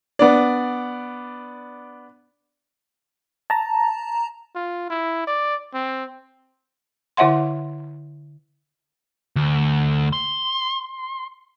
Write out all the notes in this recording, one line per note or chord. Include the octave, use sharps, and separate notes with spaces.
B3 D4 D5
A5 A#5
F4
E4
D5
C4
D3 E4 C#5 E5 F#5 C6
D2
C6